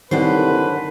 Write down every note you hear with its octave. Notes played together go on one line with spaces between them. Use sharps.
C2 F#2 D3 D#3 B4 C5